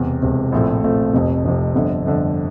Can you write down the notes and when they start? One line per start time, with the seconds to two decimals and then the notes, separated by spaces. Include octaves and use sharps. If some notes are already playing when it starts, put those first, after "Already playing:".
Already playing: E1 E2 C3
0.22 E1 E2 C3
0.52 A#1 A2 F3 A3 C4
0.83 A#1 A2 F3 A3 C4
1.13 F1 F2 C3
1.44 F1 F2 C3
1.75 G1 F2 D3
2.04 G1 F2 D3